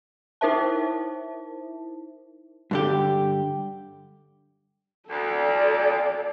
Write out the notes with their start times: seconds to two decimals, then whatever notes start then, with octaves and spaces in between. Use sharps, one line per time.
0.41 D#4 E4 A#4 C5 E5 A5
2.71 G2 D3 G4
5.09 D2 A4 D5